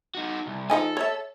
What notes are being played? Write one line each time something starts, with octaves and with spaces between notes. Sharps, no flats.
D#4 F#4
C2
F3 D#4 A4 G#5
C#5 E5